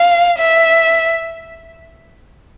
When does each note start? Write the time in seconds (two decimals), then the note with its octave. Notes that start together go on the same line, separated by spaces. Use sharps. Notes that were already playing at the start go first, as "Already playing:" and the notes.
Already playing: F5
0.39 E5